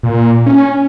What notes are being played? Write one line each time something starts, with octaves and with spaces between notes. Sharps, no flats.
A#2
C#4